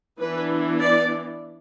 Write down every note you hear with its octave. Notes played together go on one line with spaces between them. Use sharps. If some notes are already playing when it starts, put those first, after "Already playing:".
E3 B3 D4 B4
D5